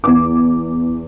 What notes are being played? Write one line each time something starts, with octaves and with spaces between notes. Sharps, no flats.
E2 D6